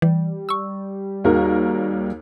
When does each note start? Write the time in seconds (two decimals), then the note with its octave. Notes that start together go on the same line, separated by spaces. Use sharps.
0.02 E3 G3
0.49 C#6 E6
1.24 D#2 D#4 F#4 G#4 A#4